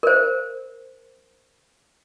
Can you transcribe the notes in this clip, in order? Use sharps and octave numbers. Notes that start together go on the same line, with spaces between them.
A#4 C5